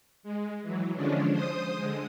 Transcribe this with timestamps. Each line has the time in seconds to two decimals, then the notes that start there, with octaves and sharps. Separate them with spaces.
0.23 G#3
0.63 E3 F#3
0.95 D3 F3 G#3 C#4 D4
1.30 C5 D#6
1.77 D3 G#3